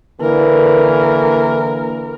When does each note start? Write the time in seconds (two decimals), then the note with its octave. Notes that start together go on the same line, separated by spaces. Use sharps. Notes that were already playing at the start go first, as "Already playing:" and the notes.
0.21 D3 E3 A#3 A#4